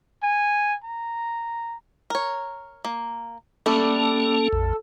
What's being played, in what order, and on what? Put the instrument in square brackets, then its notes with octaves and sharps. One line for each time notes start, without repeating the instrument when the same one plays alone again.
[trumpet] G#5
A#5
[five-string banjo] A#4 C#5
A#3
[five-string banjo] G3 A3 D4 [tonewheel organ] A#3 C#4 [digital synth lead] A4
[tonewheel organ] A#1 F2